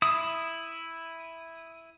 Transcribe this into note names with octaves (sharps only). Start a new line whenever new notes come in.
E4 D#6